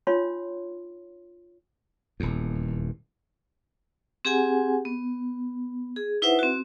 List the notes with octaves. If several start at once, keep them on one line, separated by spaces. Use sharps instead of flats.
D4 D#4 F4 C#5 C6
D#1 E2
C4 G4 G#4 F#5 G#5
B3
G#4
D#4 E4 B4 C5 E5 F#5
C4 F#4